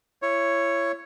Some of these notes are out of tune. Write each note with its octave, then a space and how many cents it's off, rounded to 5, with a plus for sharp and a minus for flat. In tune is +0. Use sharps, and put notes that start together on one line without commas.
E4 +35 C#5 +0